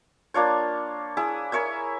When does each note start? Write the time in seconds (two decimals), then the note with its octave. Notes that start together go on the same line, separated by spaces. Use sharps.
0.34 A#3 D4 F4 C#5
1.17 E4 G#4
1.52 A#4 C#5 E5 G#5